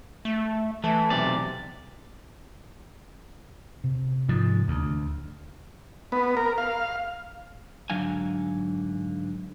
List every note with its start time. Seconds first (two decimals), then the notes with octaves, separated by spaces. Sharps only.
0.25 A3
0.84 E3 A3
1.10 B1 C3 D5
3.84 C3
4.29 G#2 F3
4.68 D2
6.12 B3
6.37 A#4
6.58 F5
7.90 G#2 D3 F#3 D4 F5 G#5